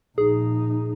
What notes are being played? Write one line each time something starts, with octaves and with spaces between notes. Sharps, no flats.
A#1 D#4 G#4